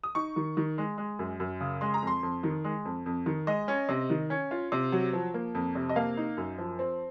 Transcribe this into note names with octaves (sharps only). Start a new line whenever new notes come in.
D#6
D#4 C#6
D#3
D#3
G#3
G#3
F#2
F#2
C#3
G#3 C6
A#5
F2 C6
F2
D#3
G#3
F2
F2
D#3
G#3 D#5
C#4
C3
D#3
C#4
F4
C3
F#3
F3
A#3
F2
C3
D#5
A#3 F5
D#4
F#2
F3
C4